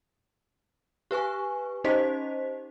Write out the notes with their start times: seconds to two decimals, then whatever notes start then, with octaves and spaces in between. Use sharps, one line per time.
1.11 G4 B4 G#5 C#6
1.84 C#4 D#4 G4 C5 D#5 B6